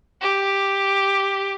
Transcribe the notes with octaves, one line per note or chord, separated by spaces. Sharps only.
G4